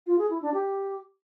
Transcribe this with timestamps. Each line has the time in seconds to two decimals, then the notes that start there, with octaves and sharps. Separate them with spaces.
0.06 F4
0.18 G#4
0.30 E4
0.42 D4
0.54 G4